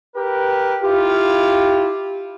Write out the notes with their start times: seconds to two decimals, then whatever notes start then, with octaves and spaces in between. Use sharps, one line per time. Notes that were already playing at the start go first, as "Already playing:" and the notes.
0.15 G4 A#4 B4
0.81 E4 F4 G4 F5